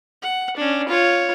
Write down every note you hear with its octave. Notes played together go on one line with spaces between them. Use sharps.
F#5
C#4 D4
F4 C#5